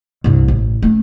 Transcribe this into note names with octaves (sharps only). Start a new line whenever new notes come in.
C2 G2
A1
A3 C#4